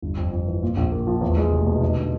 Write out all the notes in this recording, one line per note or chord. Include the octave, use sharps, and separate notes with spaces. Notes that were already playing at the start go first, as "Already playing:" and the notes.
G1
F2
F2
E3
A#2
A#1
A#3
F3
E2
G#3
F1
B2
D#4
D3